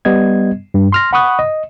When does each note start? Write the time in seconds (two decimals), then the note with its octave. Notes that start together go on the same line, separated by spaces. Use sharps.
0.05 G3 B3 D#5 G#6
0.74 G2
0.92 C6 F6 A#6
1.13 F#5 B5 C#6 D#6 F#6
1.39 D#5